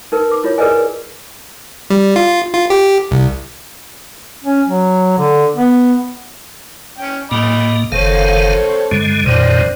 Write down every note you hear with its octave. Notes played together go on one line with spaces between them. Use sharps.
D#4 A#4 B4
D6
E4 F4 C#5
G#4 A#4 B4 D5 D#5 G#5
G3
F4
F4
G4
C2
C#4
F#3
D3
B3
C#4 G5
A2 A#3 D#5 B5 D6
F#1 D#3 C4 A4 C#5 F5
G2 D3 G#3
F2 A#2 D#3 C4 D4